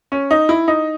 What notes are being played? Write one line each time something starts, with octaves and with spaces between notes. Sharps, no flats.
C#4
D#4
E4
D#4